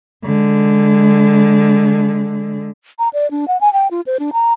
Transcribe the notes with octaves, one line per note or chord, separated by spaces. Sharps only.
D3 G#3
A#5
D5
D4
F#5
G#5
G5
F4
C5
D4
A#5